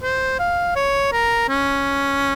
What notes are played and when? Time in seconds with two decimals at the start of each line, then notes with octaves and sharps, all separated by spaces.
0.03 C5
0.39 F5
0.76 C#5
1.12 A#4
1.49 C#4